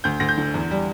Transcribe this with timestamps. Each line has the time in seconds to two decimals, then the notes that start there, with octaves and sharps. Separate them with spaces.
0.04 D2 G6
0.20 D2 A#6
0.29 G6
0.38 D3
0.54 E2
0.71 G3